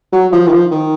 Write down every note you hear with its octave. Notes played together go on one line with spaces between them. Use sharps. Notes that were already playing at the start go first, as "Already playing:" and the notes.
F#3
F3
D#3
F3
D#3